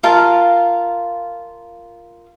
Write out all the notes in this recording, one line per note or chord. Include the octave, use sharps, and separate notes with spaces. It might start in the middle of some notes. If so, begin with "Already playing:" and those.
F4 A#4 F5 A5